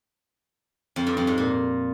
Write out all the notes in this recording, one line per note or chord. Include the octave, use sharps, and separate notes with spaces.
F2
G2
F2
G#2
A#2